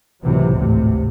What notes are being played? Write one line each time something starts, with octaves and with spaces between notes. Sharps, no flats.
C#2 A2 C3 E3 F#3
G#1 D2 A2 C3